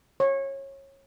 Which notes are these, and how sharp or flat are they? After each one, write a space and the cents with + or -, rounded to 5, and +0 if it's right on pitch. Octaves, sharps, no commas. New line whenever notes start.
C#5 -25